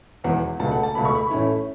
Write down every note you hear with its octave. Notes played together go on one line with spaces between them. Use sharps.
E1 E2 E3 F#5
C#2 B2 A3 A5
F#5
A5
C#2 B2 A3 B5
C#6
B5
A1 A2 A3 C#4 E4